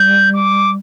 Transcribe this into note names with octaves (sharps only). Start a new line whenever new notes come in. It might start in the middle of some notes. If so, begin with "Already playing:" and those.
Already playing: G3 G6
D6